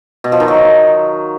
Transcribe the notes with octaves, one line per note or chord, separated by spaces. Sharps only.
B2
F3
D#3
F#3